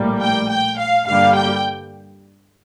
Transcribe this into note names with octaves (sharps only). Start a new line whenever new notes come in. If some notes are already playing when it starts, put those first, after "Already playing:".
Already playing: A#1 A2 G3 A#3
G5
G5
F5
G2 D3 G3 A#3 F5
G5